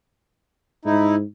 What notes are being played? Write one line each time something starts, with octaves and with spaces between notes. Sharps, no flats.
G#2 D#4 E4